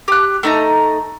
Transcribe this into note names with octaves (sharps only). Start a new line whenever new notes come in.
G4 F#6
A3 D#4 A#5